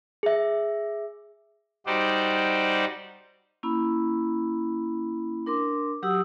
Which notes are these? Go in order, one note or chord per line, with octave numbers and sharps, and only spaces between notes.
G#4 E5
G3 D#4 F#4 C5 D5
A#3 C#4 E4 B5
D4 A#4 C6 D6
F#3 F#4 G4 F#5 D#6 E6